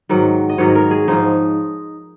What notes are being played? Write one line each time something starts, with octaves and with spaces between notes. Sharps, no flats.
G#2 D#3 F#3
D#5
G#2 D#3 F#3 C#5
A#4
G#4
G#2 F3 D#4